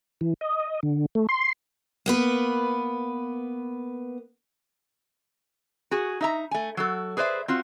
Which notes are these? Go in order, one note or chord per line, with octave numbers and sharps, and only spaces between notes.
E3
D#5
D3
A3
C6
A#3 B3 B4
F#4 G#4
D#4 E5 A#5
A3 G#5
F#3 F#4 A4
G#4 B4 C5 D5 E5
C4 F4 F#4